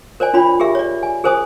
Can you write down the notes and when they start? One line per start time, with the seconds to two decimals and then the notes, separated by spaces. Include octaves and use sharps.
0.20 A#4 C5 D5 G#5
0.34 D4 F4 C#5 B5
0.60 G4 G#4 A#4 E5
0.75 C#5 D5
1.03 G#5
1.24 G#4 A#4 C5 G#5 D#6